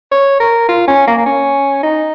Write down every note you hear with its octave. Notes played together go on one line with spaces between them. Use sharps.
C#5
A#4
F4
C#4
A#3
A#3
C#4
D#4